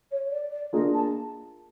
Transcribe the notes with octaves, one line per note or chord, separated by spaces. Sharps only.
C#5
D5
D5
A#3 D4 F4 G#4 D#5
A5